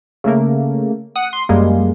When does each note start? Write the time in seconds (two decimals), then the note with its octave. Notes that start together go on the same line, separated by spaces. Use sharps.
0.24 C#3 A3 A#3
1.16 F#5 D#6
1.33 C6
1.49 F#2 G3 G#3 A#3